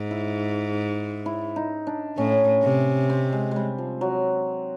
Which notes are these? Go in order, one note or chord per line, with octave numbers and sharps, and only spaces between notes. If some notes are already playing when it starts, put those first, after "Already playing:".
Already playing: G#2
E4
E4
D#4
D4
A2 C#4
C3
C4
G#3
G3 G#3
F3
F#3